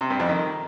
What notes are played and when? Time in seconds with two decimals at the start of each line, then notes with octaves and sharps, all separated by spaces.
0.01 C3
0.10 G2
0.20 F2
0.29 D#3